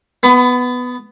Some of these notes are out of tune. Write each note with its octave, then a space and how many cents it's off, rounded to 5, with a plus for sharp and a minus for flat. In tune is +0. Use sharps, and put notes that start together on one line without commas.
B3 +5 B5 +30